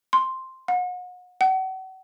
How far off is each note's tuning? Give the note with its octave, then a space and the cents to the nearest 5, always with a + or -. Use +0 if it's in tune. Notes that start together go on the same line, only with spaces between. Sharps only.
C6 +0
F#5 -40
F#5 +40